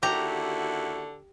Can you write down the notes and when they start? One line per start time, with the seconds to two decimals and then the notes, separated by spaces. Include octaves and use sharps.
0.03 D#2 D3 E4 F#4 G4 A#5